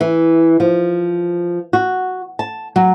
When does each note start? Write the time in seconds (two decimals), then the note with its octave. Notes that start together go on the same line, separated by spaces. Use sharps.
0.01 E3
0.60 F3
1.73 F#4
2.39 A5
2.76 F#3